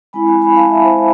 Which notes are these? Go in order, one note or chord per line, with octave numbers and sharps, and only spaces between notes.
G#3 C4 E4 G#5 B5
G#5 B5
G#5 B5
F5 A5
E5 G#5
C5 E5